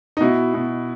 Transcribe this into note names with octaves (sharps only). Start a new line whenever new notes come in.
D#4
B2 E4
B2